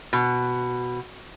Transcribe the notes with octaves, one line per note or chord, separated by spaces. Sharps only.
B2